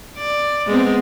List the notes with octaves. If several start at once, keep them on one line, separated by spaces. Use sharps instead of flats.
D5
G#3 B3 C4